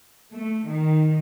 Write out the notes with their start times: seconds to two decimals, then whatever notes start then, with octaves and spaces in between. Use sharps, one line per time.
0.32 A3
0.69 D#3